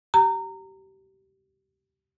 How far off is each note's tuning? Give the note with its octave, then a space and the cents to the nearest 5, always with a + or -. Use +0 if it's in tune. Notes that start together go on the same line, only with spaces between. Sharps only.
G4 -25 A#5 -20